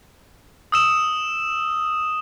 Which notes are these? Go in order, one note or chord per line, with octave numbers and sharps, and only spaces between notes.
D#6 E6 E7